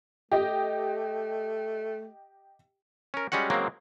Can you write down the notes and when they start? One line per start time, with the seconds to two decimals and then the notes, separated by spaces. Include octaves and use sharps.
0.32 A3 G4 D#5
3.14 C#4 A#4
3.32 G3 G#3 C#4 F#4 F#5
3.50 C#3 F#3 G#3 A#3 C4